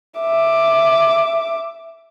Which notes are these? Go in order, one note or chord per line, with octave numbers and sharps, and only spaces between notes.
E5 D6